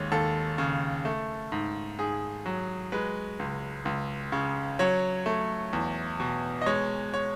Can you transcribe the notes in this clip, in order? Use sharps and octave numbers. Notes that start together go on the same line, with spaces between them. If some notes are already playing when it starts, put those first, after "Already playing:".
Already playing: D#2 G#3 C#5
D#2 A4
C#3
A3
G#2
G#2 G#4
F#3
G#3 B4
C#2
C#2
C#3
F#3 C#5
A3
E2
B2
D#5
G#3 C#5
C#5